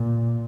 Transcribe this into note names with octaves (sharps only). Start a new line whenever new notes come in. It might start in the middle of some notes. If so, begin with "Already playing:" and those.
Already playing: A#2